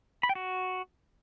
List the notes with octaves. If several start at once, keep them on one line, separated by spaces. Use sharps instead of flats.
B5
G5
F#4